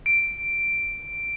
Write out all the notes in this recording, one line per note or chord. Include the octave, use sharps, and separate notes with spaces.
D7